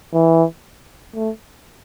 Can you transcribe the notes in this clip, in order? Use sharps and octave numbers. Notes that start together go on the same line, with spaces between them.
E3
A3